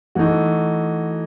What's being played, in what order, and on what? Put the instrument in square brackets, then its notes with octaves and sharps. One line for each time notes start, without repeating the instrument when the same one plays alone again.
[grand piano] E3 A3 D#4 F#4